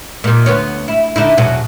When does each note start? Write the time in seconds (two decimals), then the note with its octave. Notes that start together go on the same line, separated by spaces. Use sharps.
0.24 A#2 D#3
0.46 D2 B3 C#5
0.88 E4
1.16 D3 D#4 E4
1.37 E2 B2 F#3